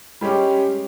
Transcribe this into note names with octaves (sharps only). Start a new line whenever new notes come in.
G3 G#3 C#4 G4